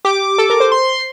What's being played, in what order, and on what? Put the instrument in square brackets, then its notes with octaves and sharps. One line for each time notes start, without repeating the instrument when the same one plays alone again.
[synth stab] G4 [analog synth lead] D6
[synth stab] A4
A#4
C5
[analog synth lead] C6